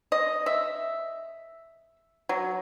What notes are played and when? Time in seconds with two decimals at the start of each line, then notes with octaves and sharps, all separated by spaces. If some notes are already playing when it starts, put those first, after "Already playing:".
0.12 D#5
0.46 E5
2.29 F#3